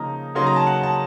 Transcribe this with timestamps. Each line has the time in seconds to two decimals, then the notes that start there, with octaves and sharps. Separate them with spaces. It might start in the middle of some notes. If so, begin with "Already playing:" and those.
Already playing: C#3 F3 A#3 D#4 A#5
0.35 C#3 F#3 A#3 D#4 C6
0.46 A#5
0.56 A5
0.67 F#5
0.83 A5